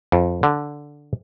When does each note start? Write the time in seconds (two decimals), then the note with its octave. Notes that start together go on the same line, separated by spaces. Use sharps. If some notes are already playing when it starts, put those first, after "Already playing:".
0.12 F2
0.43 D3